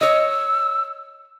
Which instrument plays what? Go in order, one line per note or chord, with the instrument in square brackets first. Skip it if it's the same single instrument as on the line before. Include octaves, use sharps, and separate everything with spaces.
[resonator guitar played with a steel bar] C#5 D#5 [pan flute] E6